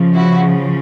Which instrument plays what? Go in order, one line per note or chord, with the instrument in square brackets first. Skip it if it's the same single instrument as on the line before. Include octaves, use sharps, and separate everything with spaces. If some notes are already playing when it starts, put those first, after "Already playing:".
Already playing: [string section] C#3 F3
E4 F#4